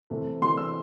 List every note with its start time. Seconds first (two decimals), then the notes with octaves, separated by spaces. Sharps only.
0.10 C3 E3 A3
0.42 C3 E3 A3 C6
0.57 E6